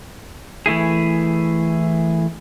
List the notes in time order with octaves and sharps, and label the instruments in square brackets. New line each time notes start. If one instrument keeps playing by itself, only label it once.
[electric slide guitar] E3 A3 E4 G#4